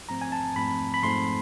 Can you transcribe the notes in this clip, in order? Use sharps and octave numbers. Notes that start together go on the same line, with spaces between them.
G#2 F3 A3 C4 A#5
G#5
A5
G#2 F3 A3 C4 B5
B5
G#2 F3 A3 C4 C6